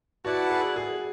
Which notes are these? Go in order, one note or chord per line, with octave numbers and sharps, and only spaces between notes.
E4 F#4 B4 D5 F#5 A5
G#4
G#4